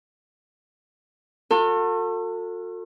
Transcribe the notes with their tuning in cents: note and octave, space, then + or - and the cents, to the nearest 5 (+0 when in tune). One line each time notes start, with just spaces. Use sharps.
F#4 -40 A4 +35